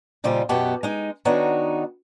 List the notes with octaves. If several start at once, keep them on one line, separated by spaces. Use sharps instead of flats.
A#2 C#3 G3 D#4 F4 C5
F#2 B2 B3 F#4 G4 A5
G#3 D#4
D#3 B3 D4 D#4 F#4 C#5